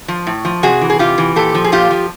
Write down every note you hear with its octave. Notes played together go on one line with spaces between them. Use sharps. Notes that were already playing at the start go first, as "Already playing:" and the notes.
F3
A2
F3
C3 F#4 G#4
E3
G#4
C3 F4 G4
E3
A#2 G4 A4
F3
G#4
A#2 F4 G4
F3